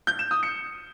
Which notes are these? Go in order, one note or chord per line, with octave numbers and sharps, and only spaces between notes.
G6
E7
D#6
C#7